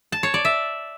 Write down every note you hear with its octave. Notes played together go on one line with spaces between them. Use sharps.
A5
C#5
D5
E5